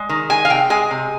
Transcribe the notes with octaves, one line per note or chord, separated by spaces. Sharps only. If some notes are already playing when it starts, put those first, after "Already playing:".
Already playing: G#3
D#3
G#3 G#5
F5
C3 G5
G#3 G#5
C3